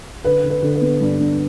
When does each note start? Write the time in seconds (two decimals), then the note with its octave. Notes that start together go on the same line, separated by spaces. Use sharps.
0.25 D3 B4
0.44 D3
0.50 B4
0.62 D3
0.75 B4
0.81 B3
1.01 G2
1.20 G2